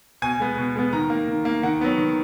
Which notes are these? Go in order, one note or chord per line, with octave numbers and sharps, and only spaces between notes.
B2 G#5
G#3 B3
B2
G#3 B3
D#3 A#5
A#3
D#3
A#3
D#3 F#5
F#3 B3
D#3